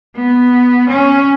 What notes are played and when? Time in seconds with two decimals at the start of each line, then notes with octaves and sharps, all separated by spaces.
0.16 B3
0.89 C#4